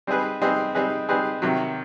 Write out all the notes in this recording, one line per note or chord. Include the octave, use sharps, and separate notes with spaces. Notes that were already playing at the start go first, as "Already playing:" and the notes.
G3 C4 D#4 G#4 B4
G3 C4 D#4 G#4 B4
G3 C4 D#4 G#4 B4
G3 C4 D#4 G#4 B4
C3 D#3 F#3